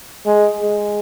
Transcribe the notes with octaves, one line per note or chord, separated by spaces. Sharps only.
G#3
G#3